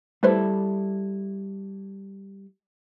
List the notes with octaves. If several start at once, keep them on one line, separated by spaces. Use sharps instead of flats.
G3 A3 E4 A4 B4 C5